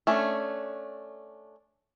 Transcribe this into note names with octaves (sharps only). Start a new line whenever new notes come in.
A3 C#4 D4